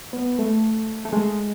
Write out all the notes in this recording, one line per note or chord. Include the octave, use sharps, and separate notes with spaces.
B3
A3
A3
G#3